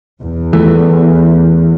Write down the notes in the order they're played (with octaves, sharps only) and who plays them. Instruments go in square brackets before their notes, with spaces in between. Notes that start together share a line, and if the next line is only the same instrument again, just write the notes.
[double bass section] E2
[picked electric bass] E3 A3